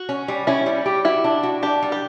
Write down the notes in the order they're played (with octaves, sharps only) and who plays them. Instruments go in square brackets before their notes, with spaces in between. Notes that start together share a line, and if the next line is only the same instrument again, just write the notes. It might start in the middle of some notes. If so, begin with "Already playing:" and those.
Already playing: [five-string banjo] F#4
[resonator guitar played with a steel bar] C#4
G3
[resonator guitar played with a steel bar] C#4 [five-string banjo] E4
[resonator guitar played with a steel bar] G3
G4
[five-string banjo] E4 [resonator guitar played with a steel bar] F#4
[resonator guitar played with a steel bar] D4
F#4
[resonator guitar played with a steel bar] D4 [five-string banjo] G4
[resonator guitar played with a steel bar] G3
[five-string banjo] G4